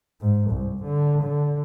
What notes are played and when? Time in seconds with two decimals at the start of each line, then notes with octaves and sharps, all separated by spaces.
0.21 G#2
0.51 C2
0.85 D3
1.23 D3